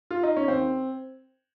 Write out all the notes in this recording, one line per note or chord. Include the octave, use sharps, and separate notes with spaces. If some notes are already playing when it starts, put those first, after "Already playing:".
F4
D#4
C#4
D#2 C4